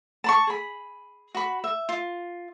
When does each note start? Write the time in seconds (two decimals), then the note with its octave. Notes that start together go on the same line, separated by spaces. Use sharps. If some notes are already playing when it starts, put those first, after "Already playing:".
0.24 A5 B5 C#6
0.47 G#4 B5
1.35 F#4 B5
1.64 E5
1.89 F4